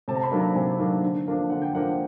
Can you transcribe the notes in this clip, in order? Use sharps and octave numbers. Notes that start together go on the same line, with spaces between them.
C3 A5
A#5
B5
D#3 F#3 A#3 D4
A#5
C3 G#5
D#3 F#3 A#3 D4
D3
F3 A#3 D4
D3 F#5
G5
F3 A#3 D4 F#5